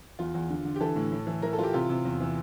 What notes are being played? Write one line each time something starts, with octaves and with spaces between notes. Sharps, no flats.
E2 F4
E2
D3
D3
G4
E3 A4
A2
A2
E3
E3 A#4
A4
E3 F4 G4
C3 F4
C3
E2
E3